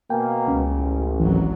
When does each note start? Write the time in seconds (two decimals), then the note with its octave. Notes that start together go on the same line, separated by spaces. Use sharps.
0.10 B2 A#3 G5 G#5
0.48 C#2 C#4
0.77 A1
1.20 G#1 E3 F#3